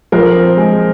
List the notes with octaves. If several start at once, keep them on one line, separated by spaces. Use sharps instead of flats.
F3 A#4 C5
C4
G#3